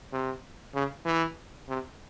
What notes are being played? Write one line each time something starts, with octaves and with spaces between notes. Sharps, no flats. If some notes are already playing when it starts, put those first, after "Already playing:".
C3
C#3
E3
C3